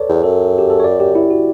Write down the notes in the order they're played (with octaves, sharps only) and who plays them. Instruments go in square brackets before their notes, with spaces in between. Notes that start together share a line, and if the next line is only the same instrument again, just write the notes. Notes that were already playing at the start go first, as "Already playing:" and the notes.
Already playing: [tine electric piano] A4 B4 C#5 D5
[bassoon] E2
[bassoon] F#2 [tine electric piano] A4
[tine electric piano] G4
A4
C#5
D5
G4
E4
F#4